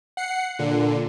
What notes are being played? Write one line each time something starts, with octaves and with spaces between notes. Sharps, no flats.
F#5 C7 C#7
A#2 D3